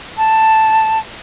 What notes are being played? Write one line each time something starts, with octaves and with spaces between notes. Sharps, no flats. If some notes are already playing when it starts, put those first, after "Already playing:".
A5